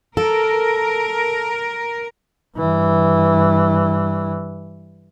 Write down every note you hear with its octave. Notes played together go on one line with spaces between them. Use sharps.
A4 A#4
G2 E3